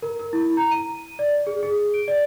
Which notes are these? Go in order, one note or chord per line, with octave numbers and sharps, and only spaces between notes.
A#4
A#4
E4
A#5
D#7
D5
G#4
G#4
D7
D5